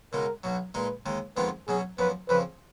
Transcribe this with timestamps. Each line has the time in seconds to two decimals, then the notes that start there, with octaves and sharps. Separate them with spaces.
0.13 C#2 B2 G#3 D#4 A#4
0.44 B1 B2 F#3
0.74 A#2 G#3 D#4 B4
1.06 D#2 D#3 G#3
1.37 F2 D#3 G#3 B3 F4 B4
1.68 B2 F#3 C#4 G#4
1.99 F#2 F3 B3 B4
2.29 F2 C#3 F3 B4